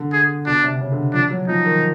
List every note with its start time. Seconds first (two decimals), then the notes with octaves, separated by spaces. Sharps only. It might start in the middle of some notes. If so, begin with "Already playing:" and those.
Already playing: D3
0.13 G#4
0.46 B2 D4
0.64 C3
0.80 C#3
0.92 D3
1.14 F3 D4
1.30 F#3
1.48 F3 D#4
1.65 D#3